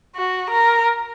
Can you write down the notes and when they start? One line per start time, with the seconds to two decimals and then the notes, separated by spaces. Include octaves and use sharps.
0.16 F#4
0.50 A#4